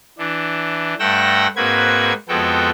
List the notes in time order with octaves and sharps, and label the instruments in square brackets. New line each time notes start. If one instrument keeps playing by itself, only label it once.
[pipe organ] E3 D4
G2 A3 F#5 G5 E6 A#6
G#2 A#3 C4 F#4 B4 G#6
F2 G#3 B3 F#4 A4 G5